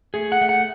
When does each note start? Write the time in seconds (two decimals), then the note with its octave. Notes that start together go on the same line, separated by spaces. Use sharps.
0.14 A3 G#4
0.32 F#5
0.41 A3
0.49 F#5